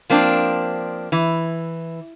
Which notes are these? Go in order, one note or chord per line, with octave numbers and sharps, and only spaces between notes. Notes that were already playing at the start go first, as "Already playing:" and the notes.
F3 A#3 C4 D4
E3